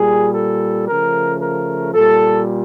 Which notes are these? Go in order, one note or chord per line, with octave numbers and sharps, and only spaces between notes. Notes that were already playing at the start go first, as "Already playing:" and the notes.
Already playing: A#2 G3 G#4
A4
C#3 F3 A3 A#4
A#4
A#2 G3 A4